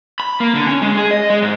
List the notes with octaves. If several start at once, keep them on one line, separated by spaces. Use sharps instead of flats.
B5
A#3
D3
C#4
G#3
G#4
D#5
G#3
G#2